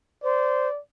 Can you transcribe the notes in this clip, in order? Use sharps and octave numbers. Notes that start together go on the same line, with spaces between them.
C5 D5